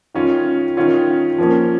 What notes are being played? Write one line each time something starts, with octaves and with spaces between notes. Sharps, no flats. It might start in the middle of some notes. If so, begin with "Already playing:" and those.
D#3 C#4 F4
D#3 C#4 F4
F3 A#3 C#4